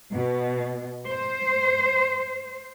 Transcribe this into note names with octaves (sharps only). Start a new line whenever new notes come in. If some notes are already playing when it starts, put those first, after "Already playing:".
B2
C5